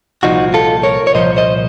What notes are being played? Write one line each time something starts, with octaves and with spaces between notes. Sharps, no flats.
C2 A#2 F3 D#4 F#4
F4 A4
A#4 C#5
C#5
C2 A#2 F3 C5 D#5
C5 D#5